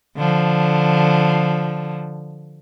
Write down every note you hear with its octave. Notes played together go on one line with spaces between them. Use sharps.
D3 F3